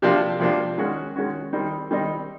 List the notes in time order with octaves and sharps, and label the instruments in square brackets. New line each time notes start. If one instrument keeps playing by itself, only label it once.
[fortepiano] C3 F3 A#3 D4 F4
C3 F3 A#3 D4 F4
D#3 G#3 C#4 F#4
D#3 G#3 C#4 F#4
D#3 G3 C4 D#4
D#3 G3 C4 D#4